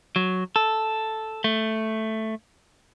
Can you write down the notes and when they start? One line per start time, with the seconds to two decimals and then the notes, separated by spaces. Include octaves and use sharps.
0.16 F#3
0.56 A4
1.44 A3